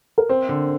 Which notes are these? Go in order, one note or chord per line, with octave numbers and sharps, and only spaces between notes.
A#4
C4 C5
D3